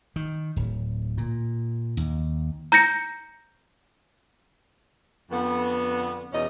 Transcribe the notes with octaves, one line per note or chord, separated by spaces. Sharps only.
D#3
D1
A#2
D#2
A#5 G6 A#6 C#7
F2 D3 B3
E2 B2 C#4 D#5